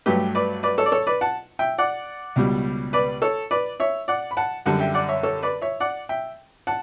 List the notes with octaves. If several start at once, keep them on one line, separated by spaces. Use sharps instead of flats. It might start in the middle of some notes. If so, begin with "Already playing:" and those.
G2 F#3 A3 G4 B4
B4 D5
B4 D5
A4 C#5
D5
A4 C#5
B4 D5
F#5 A5
E5 G5
D5 F#5
C#2 B2 G3
B4 D5
A4 C#5
B4 D5
C#5 E5
D5 F#5
B5
F#5 A5
F#2 D3 G3 F#5 A5
E5 G5
D5 F#5
C#5 E5
A4 C#5
B4 D5
C#5 E5
D5 F#5
E5 G5
F#5 A5